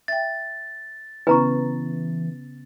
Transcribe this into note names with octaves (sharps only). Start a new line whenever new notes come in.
E5 G5 A6
C#3 E3 B3 C#4 B4 A#5 C#6